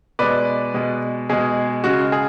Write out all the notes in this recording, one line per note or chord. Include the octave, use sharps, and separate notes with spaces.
B2 G#3 B4 D5
B2 G#3
B2 G#3 G#4
C#3 G#3 F#4
G#4